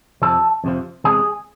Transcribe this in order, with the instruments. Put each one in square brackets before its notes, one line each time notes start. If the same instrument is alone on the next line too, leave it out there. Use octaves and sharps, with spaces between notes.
[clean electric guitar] F2 C3 F3 A4
F2 C3 F3
E2 C3 G#3 G#4